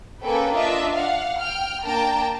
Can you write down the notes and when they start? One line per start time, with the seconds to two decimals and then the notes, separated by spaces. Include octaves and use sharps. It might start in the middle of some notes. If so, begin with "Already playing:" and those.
0.21 A#3 C#4 A4 B4 G5
0.52 D4 F4 D#5 E5
0.95 F5 F#5
1.39 G5 F6
1.84 A#3 D4 G5 A5 A#5